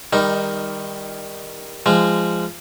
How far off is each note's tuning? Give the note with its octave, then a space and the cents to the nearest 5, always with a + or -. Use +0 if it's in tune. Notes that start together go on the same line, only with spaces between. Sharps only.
D#3 +10 G3 +30 D#4 +0
F3 -20 G#3 -15